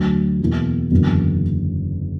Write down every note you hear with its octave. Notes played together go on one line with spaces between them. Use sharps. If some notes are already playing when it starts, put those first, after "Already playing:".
Already playing: D2 D3 F#3
E2 B2 A#3 E4
F#1 E2 D3 F#3 A#3